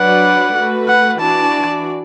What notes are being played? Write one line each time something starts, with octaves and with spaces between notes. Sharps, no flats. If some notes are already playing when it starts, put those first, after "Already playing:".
Already playing: F#3 D4 B4 D5 F#5
A3 F#4 B4
F#5
E3 D4 F#4 D5 A5